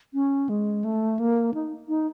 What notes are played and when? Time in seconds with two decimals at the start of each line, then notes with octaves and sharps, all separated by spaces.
0.14 C#4
0.49 G#3
0.84 A3
1.19 A#3
1.54 D#4
1.89 D#4